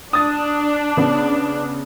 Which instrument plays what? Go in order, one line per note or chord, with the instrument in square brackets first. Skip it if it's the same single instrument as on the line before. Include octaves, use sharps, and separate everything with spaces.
[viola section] D4 [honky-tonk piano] D#6 A6
[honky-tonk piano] C#3 B3